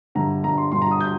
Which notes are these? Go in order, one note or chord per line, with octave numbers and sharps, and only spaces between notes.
G1 G2 D3 A#5
G1 G2 D3 A#5
C6
G1 G2 D3 C6
A#5
D#6
G6